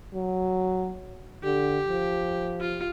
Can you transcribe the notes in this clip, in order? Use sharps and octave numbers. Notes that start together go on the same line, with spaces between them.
F#3
D3 G4
F3
F4